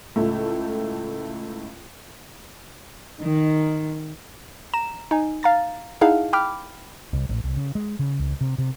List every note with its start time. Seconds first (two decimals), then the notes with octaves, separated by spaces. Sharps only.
0.16 C#2 A2 A3
3.21 D#3
4.74 A#5 E7
5.11 D#4 G#5
5.43 F5 A#5 A6
6.01 D#4 E4 G#4 F5 F#5 A5
6.33 G5 B5 D6 F6
7.13 C2
7.29 A1
7.44 C2
7.57 C#3
7.75 G#3
7.99 C#3
8.19 C#2
8.41 C3
8.58 C3